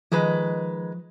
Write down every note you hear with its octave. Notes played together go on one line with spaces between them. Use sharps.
D#3 F3 G#3 B4